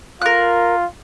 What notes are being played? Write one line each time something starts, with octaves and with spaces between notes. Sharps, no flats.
F4 A#4 F#6